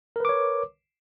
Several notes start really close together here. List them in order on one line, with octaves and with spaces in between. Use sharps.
A#4 B4 D6 C#5